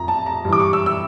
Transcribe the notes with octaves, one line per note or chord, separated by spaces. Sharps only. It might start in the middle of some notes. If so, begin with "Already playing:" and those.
Already playing: F2 F3 A#5
A5
A#5
G2 E3
D6
C#6
E6
E6